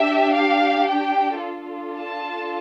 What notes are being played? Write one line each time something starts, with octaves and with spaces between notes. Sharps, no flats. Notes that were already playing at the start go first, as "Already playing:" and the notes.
Already playing: D4 G4 E5
F5
G5
D4 F4 A4
A5